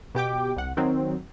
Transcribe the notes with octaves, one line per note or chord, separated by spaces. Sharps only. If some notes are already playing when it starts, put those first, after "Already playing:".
B2 G4 G5 D6
C2 F#5
D#3 F#3 C4